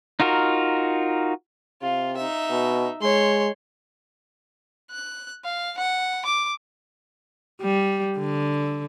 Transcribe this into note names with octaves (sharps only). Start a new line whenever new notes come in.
D#4 F4 F#4 A#4
C3 F4
D#4 E5
B2
G#3 C#5 C6
F#6
F5
F#5
D6
G3
D3